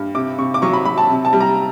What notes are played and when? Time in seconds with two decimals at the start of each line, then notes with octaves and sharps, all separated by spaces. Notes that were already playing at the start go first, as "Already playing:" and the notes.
Already playing: G2
0.15 C3 D6
0.38 C3 C#6
0.54 D6
0.62 F#3 C#6
0.73 B5
0.85 F#3 B5
0.98 A5
1.09 C3
1.25 A5
1.33 G3
1.40 A#5